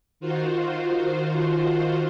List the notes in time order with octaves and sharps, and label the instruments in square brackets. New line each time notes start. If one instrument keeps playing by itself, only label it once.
[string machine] D#3 F4 F#4 C5